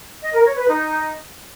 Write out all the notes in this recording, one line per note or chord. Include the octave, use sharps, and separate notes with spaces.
D#5
A#4
C#5
B4
D#4